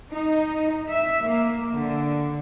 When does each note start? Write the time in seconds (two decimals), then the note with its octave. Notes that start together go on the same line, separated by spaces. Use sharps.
0.12 D#4
0.88 E5
1.27 A#3
1.76 D3